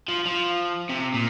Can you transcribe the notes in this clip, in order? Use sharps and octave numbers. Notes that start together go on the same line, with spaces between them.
F3
F3
C3
A#2